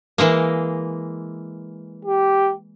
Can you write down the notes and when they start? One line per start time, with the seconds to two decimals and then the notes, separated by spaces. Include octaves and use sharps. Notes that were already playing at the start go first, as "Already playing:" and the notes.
0.18 E3 G#3 A#3
2.05 G4